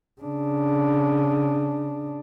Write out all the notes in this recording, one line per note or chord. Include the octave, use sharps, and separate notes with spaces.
C#3 D4